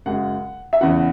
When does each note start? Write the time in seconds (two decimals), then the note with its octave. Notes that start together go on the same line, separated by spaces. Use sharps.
0.06 F#2 C#3 G#3 F#5
0.73 E5
0.81 E2 C#3 E3 F#5